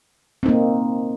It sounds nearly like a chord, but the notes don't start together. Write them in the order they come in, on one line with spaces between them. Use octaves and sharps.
C4 D#4 A#3